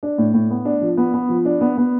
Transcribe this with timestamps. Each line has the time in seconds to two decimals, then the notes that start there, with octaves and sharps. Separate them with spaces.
0.03 D4
0.18 A2
0.34 A2
0.50 B3
0.65 D4
0.81 F3
0.97 B3
1.14 B3
1.29 F3
1.45 D4
1.61 B3
1.77 B3